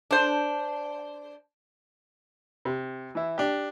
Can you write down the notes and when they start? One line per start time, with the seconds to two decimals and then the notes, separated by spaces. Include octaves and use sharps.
0.11 D4 C5
2.65 C3
3.15 E3 E4
3.38 D4 G4